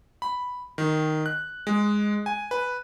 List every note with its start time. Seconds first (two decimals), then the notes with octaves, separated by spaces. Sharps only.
0.22 B5
0.78 D#3
1.26 F#6
1.67 G#3
2.26 G#5
2.51 B4